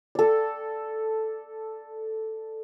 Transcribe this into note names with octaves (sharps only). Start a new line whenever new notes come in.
A4 D5